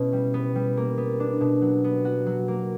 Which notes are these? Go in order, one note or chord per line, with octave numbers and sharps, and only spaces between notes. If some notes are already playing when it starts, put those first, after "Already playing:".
Already playing: B2 C#4 E4
G3
B3
G3
A#3
B3
D4
B2
F#3
B3
F#4
F#3
A#3